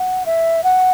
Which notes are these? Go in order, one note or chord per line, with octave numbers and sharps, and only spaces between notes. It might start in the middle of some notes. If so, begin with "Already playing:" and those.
Already playing: F#5
E5
F#5